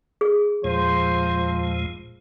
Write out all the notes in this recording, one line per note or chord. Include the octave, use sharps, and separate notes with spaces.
G#4
E2 A#2 F3 G#3 C5